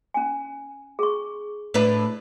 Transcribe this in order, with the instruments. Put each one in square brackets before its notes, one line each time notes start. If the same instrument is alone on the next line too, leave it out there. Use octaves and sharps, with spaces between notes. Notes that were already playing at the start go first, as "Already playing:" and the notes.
[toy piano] C#4 G#5
G#4 C#6
[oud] A2 D4 B4